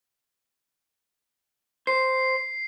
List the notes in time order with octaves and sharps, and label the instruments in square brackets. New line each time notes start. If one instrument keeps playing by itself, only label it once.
[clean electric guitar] C5 [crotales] C7